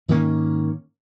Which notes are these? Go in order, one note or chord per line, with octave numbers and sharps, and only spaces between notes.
G#2 D#3 A#3 C#4